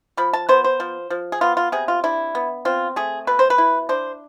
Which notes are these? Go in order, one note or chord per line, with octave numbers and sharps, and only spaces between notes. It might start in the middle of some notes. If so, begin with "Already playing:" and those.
F3 B5
A5
B3 C5
C5
F3
F3
G#4
B3 F4
F4
C3 G#4
F4
D4 E4
B3
C4 F4
A3 G#4
B2 B4
C5
B4
E4
D4 C5